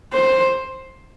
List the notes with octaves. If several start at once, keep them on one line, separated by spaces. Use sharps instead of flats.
C5